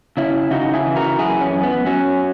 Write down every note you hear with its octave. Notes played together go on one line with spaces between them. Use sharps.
C#3 C#4 E4
C#3 D#4 F#4
E4 G#4
E3
F#4 A#4
F#2 E4 G#4
C#4
F#2
B3
F#3 C#4